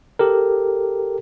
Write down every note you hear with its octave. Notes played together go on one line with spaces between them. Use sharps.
G4 A4 A#4